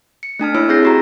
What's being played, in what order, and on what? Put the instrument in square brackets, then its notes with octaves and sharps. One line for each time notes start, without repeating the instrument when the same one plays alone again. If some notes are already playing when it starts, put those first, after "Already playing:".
[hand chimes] C#7
A3 D4 A5 F6
A#3 E4 C#5 B5 E6 D7
C4 G#4 G6 A#6 C7
F#4 G4 A#5